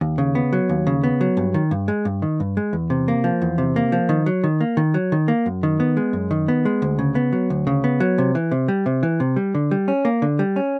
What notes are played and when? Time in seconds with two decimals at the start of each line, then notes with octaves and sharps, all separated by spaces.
0.01 D#2
0.18 C#3
0.35 B3
0.53 F#3
0.69 D#2
0.87 C#3
1.03 B3
1.21 F#3
1.37 G2
1.54 D#3
1.71 G2
1.88 G#3
2.05 G2
2.22 D#3
2.40 G2
2.57 G#3
2.73 E2
2.90 C3
3.08 A#3
3.24 F3
3.42 E2
3.58 C3
3.76 A#3
3.92 F3
4.09 D#3
4.26 F#3
4.44 D#3
4.61 A#3
4.77 D#3
4.94 F#3
5.12 D#3
5.28 A#3
5.46 F#2
5.63 D#3
5.80 B3
5.97 G#3
6.13 F#2
6.31 D#3
6.48 B3
6.65 G#3
6.82 D2
6.99 C#3
7.15 B3
7.33 F#3
7.50 D2
7.67 C#3
7.84 B3
8.00 F#3
8.18 C3
8.35 E3
8.51 C3
8.68 G3
8.86 C3
9.03 E3
9.20 C3
9.36 G3
9.55 D3
9.71 G3
9.88 C#4
10.05 A#3
10.22 D3
10.39 G3
10.56 C#4